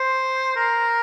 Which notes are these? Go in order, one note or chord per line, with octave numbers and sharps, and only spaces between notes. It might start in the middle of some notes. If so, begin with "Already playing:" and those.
Already playing: C5
A#4